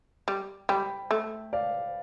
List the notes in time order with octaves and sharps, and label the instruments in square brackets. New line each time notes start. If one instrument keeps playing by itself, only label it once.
[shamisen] G3
[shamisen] G3 [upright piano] G5 B5
[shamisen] A3
[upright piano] D5 F5